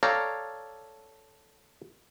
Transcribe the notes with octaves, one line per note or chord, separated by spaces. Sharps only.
A4 C#5 D5 F5 G5 A#5